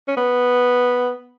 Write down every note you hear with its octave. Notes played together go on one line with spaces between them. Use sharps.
C#4
B3